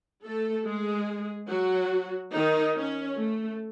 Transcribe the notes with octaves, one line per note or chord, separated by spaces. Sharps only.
A3 A4
G#3 G#4
F#3 F#4
D#3 D#4
C#4
A3